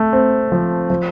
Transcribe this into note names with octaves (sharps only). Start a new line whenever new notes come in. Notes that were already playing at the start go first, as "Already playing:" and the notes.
Already playing: A3
C4
F3
F3